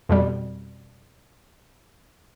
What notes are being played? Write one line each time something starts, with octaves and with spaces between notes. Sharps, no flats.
F2 B2 G3